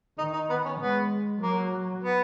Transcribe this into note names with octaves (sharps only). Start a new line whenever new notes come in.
D#3 D#4
D#4
B3
C#4
G#3 B3
F#3 A#3
B3